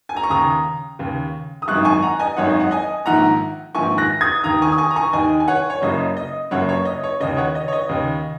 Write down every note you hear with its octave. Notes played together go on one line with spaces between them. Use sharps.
G#5
A#5
C#6
D#2 C#3 A#5 D#6
D#2 C#3
D#6
G#1 F#2 D#3 C#6 F#6
G#5 C#6
F#5 A#5
D#5 G#5
G#1 F#2 D#3 C#5 F#5
D#5
F#5
D#5 G#5
A#1 G#2 D#3 F#5 A#5
A#1 G#2 D#3 G#5 C#6
F#6 A#6
D#6 G#6
D#2 D#3 A#5 D#6
G#5 C#6
D#6
G#5 C#6
A#5
G#5 C#6
D#2 D#3 D#5 G#5
G#5
C#5 F#5
C#5
F#1 F#2 C#3 D#5
D#5
F#1 F#2 C#3 C#5 F#5
C#5
D#5
C#5
D#2 C#3 D#5
C#5 F#5
D#5
C#5
D#5
D#2 C#3